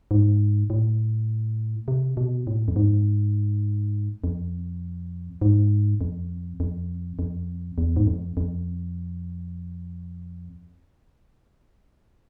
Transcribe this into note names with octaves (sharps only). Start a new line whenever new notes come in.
G#2
A2
C3
B2
A2
F2
G#2
F2
G#2
F2
F2
F2
E2
G#2
F2
F2